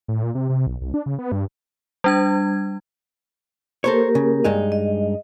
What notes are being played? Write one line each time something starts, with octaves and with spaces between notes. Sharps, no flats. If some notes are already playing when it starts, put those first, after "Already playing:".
A2
A#2
C3
C3
B1
C2
D4
C#3
B3
G2
G3 D4 G#6
A#3 G4 A4 A#4 C5 C#5
C#3
G2 G#3 D#4
D#5